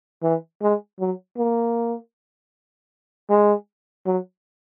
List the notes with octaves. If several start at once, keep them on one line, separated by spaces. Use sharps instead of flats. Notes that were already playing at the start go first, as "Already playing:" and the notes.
E3
G#3
F#3
A#3
G#3
F#3